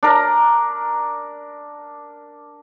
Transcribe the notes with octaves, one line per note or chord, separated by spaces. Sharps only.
D4 A#4